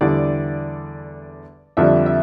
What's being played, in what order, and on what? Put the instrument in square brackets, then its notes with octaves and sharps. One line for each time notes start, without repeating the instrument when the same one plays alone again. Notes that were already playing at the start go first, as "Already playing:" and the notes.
[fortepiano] E2 D3 G3 D5
F2 D3 G3 E5
E5